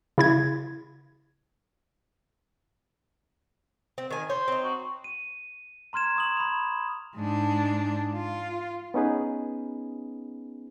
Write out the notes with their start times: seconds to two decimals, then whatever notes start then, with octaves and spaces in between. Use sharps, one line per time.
0.18 C#3 E4 G#6
3.98 C4
4.11 D#3 G#5
4.30 C5 C#5
4.48 C4 D#4
4.63 F#4
5.04 D#7
5.93 A#5 C6 F6 G#6 E7
6.16 C#6 D#6 F#7
6.37 B5 F7
7.16 G#2 D4
8.15 F4
8.94 B3 C#4 D#4 G#4 B4